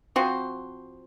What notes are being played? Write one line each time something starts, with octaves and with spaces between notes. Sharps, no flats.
F3 C4 F#4 C5